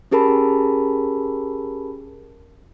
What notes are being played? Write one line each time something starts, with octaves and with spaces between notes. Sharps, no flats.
C#4 G4 G#4 A#4 A5 B5